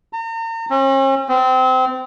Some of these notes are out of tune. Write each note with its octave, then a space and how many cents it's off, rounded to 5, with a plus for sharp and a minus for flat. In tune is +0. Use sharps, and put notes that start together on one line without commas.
A#5 -40
C#4 -45
C4 -25